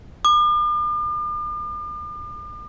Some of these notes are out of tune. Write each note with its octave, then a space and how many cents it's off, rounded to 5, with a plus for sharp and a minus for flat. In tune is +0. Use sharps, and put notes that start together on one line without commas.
D6 +45